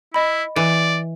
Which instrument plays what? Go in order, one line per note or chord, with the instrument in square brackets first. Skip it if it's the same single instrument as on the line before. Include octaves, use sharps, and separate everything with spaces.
[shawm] E4 [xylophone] D#5 B5
[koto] E3 [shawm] D5